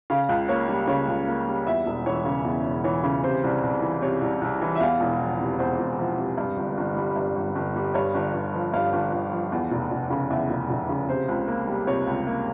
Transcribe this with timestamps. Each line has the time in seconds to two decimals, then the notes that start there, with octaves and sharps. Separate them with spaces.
0.10 C#3 F5
0.29 C#2
0.49 A#3 C#5
0.68 G3
0.87 C#3 C#5
1.07 C#2
1.28 A#3
1.47 G3
1.67 E2 E5
1.86 E1
2.06 E3 C#5
2.25 C#3
2.45 E2
2.65 E1
2.84 E3 C#5
3.04 C#3
3.23 C3 C5
3.44 C2
3.63 C2
3.82 E3
4.02 C3 C#5
4.22 C2
4.41 C2
4.62 E3
4.75 E5
4.80 E2 F5
5.00 E1
5.20 F3
5.40 C3
5.59 E2 C5
5.79 E1
5.99 F3
6.18 C3
6.38 G2
6.57 G1
6.77 G1
6.97 G3
7.16 G2
7.36 G1
7.55 G1
7.76 G3
7.94 G2 C#5
8.14 G1
8.34 G1
8.54 F3
8.74 G2 F5
8.93 G1
9.12 G1
9.32 F3
9.52 E2
9.71 F1
9.92 F1
10.10 C#3
10.30 E2 E5
10.50 F1
10.70 F1
10.89 C#3
11.09 C3 C5
11.28 C#2
11.48 A#3
11.68 G3
11.87 C3 C#5
12.07 C#2
12.27 A#3